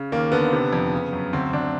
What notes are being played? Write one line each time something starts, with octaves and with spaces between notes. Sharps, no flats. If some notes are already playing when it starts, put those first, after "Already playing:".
Already playing: C#3
D#2 A#3
D3 B3
C3
F2
C#3
F#2
D2 C4
D2 D4